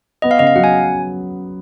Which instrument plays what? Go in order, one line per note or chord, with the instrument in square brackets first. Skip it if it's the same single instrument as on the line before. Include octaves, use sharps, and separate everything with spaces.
[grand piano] B3 [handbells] D#5
[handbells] F5
[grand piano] C#3 [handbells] D#5
[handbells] F5
[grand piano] F#3 [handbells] F#5
[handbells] G#5